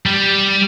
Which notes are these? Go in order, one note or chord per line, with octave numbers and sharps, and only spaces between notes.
G3